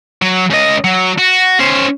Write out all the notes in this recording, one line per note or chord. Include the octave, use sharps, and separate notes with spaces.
F#3
C#2 D#5
F#3
F#4
C#4 C5